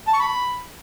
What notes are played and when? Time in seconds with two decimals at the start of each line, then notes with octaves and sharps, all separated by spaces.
0.08 A5
0.13 C#6
0.19 B5